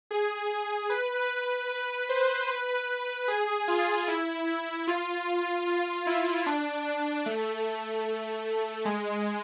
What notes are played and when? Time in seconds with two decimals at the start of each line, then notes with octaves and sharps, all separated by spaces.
0.11 G#4
0.90 B4
1.70 B4
2.09 C5
2.49 B4
3.28 G#4
3.68 F4
4.08 E4
4.87 F4
5.67 F4
6.07 E4
6.46 D4
7.26 A3
7.66 A3
8.85 G#3